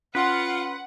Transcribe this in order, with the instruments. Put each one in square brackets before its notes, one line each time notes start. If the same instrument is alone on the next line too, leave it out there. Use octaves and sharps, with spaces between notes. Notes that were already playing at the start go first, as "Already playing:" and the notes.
[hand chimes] C#4 C6 [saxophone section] F4 [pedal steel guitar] B4 [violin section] F#5